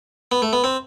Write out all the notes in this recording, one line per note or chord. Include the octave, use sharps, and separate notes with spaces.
B3
A3
B3
C4